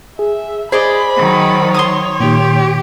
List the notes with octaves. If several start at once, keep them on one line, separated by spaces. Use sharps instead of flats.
G#4 E5
G#4 C5 D5 D#5 B5
D#3 F#3
C#5 C6 D6 D#6
A#2 D#3 G4